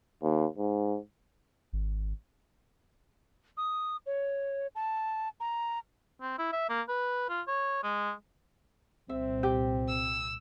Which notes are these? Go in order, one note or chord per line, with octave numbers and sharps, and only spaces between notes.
D#2
G#2
G#1
D#6
C#5
A5
A#5
C4
E4
E5
A#3
B4
F4
C#5
G#3
C2 A#2 C4 E5
G4
E6